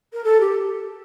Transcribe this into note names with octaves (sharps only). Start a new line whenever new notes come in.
A#4
A4
G4